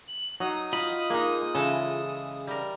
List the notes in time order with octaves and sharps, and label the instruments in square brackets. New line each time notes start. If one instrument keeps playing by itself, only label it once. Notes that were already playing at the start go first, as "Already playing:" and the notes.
[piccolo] F#7
[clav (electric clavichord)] F#3 [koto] D#4 [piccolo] D#6
[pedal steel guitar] F4 D#5 B5
[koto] G#3 D#4 [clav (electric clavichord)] A#3
[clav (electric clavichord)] C#3 [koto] E3 G#3 A4
[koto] G3 A#4